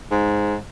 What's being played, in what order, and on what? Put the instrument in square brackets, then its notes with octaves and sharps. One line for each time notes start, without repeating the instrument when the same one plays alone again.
[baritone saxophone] G#2